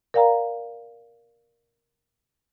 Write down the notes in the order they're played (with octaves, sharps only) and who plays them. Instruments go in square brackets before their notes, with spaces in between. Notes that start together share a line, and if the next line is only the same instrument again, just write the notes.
[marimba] A#4 D5 F5 G5 A#5